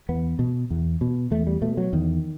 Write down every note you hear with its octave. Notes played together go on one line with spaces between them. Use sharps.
E2 B3
B2
E2
B2
E2 A3
G3
B2 A3
F#3
E2 D#3